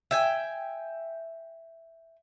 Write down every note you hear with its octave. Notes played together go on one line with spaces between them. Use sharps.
E5 G5 G#5